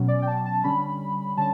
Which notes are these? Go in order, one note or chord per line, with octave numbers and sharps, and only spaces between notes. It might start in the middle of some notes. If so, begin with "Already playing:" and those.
Already playing: B2 F#3 C#4
D5
G5
A5
A5
D3 G3 C#4 B5
D3 G3 C#4 A5